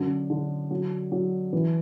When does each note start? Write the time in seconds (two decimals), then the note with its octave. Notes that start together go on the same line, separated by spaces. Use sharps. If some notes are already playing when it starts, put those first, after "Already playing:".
Already playing: F#2 D3
0.30 D3
0.71 F#3
1.12 F#3
1.53 E3